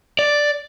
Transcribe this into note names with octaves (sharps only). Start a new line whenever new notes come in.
D5